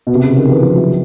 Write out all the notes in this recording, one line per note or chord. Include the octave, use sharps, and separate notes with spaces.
B2
C3
C#3
D#3
E3
F3
F#3